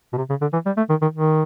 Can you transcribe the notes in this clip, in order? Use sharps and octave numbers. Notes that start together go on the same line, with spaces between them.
B2
C3
C#3
D3
E3
G3
A3
D#3
D#3
D#3